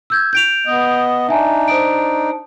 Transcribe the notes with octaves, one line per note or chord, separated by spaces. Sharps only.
E6 G6 G#6
G6 D7 F7
B3 D#5
D4 D#4 E5 G#5
C5 D#6 D7